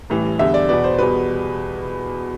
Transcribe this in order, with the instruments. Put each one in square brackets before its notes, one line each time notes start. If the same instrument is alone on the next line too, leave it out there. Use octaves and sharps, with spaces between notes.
[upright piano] A1 A2 E3 G3
E2 D3 G3 E5
D5
E2 B2 B3 D5
C5
E2 B2 G3 B4